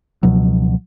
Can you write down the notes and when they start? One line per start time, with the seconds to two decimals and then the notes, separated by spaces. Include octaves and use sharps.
0.23 C#2 B2 F3 F#3